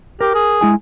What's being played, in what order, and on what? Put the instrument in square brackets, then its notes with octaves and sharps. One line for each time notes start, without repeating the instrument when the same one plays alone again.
[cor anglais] G4 [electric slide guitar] A#4
[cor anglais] G#4
[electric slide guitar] G#3 E4 G#5